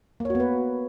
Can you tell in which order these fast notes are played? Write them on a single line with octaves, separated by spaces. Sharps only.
A#3 C#5 F#4 B3 B4